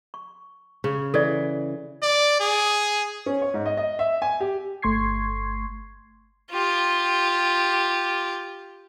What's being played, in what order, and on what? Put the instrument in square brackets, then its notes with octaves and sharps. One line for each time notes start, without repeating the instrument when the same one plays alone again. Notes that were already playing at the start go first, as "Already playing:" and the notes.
[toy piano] C#6
[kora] C#3 C#5
[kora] E3 [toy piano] A4 D5
[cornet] D5
G#4
[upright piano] C#4
C#5
G#2
D#5
D#5
E5
G#5
G4
[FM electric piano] G1 A3 C6 C#6 G#6 C7
[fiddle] F4 G4